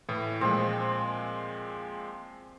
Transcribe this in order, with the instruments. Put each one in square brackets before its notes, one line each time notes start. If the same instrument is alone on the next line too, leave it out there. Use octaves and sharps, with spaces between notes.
[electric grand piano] A2 E3
[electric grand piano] A#2 F3 G#3 [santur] C4